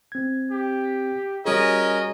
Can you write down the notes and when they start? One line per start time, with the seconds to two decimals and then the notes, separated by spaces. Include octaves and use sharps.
0.12 C4 G#6
0.52 G4
1.46 G3 C#4 F#4 G#4 A#4 D#5 A#5